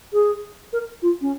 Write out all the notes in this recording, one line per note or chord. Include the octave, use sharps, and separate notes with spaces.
G#4
A#4
F4
C#4